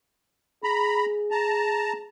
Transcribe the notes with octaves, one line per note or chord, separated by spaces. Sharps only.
G#4 A#5 B5
A5 A#5